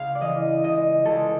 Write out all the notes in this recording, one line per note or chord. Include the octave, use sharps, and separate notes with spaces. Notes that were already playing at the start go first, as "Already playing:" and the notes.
Already playing: C#2 C#3 F5
D5
E3 D#5
C#2 D#5
C#2 A4